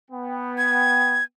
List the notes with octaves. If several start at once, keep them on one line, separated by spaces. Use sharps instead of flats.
B3 G5
G#6